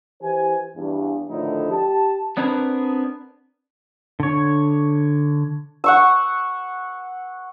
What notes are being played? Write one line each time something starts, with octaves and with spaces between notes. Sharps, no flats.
E3 E4 G4 C5 G#5
E2 G2 E3
A2 D3 D#3 F3 D#4 E4
G4 A5
B3 C4 D4 G#4 A#4 B4
D3 C#5
F#5 C#6 E6